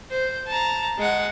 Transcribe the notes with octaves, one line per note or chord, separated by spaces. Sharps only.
C5
A5 A#5
G#3 F#5